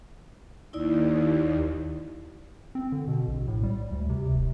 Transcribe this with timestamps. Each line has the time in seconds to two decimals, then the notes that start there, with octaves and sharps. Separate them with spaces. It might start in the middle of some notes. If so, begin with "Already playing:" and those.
0.73 D#2 D#4 E4 D5
2.75 C4
2.92 D3
3.08 B2
3.28 A#1
3.48 A2
3.63 G3
3.92 D2
4.09 C3
4.33 F1